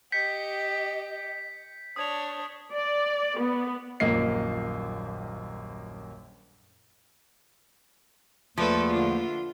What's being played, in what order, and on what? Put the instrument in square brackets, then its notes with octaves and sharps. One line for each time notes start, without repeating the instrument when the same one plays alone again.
[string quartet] G4 D#5 [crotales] G6 B6 C#7
[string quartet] D4 C#5 [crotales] D#6 G#6 F7
[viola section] D5
B3
[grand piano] D#1 A#1 F#2 A#3 D#5 C7
[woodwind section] E2 A3 A#3 [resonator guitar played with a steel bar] F3 [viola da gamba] A4 B4 D5
[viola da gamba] D3 F4